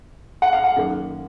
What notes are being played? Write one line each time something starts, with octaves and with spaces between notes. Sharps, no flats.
F#5
F5
F#5
F#2 D#3 A#3